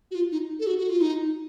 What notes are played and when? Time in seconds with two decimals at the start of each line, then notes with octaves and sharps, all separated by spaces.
0.11 F#4
0.15 F4
0.32 D#4
0.60 A4
0.67 F#4
0.78 F#4
0.89 F4
1.01 D#4